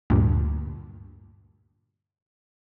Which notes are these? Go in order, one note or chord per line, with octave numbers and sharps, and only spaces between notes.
D2 G2 A#2